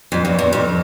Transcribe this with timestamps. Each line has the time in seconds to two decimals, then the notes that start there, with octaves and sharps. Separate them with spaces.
0.12 F2
0.25 E2
0.39 E2
0.53 F2